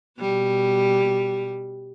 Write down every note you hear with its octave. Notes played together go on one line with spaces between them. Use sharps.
B2 G3